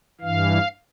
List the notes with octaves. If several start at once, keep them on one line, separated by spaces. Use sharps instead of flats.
G2 E3 F5